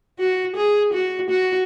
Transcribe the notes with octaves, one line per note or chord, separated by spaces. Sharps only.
F#4
G#4
F#4
F#4